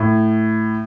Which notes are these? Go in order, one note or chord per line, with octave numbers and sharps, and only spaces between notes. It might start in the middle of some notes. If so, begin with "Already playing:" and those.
Already playing: A2